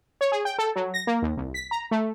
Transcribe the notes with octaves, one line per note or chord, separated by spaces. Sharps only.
C#5
G#4
G5
A4
F#3
A#6
A#3
D#2
C2
B6
A#5
A3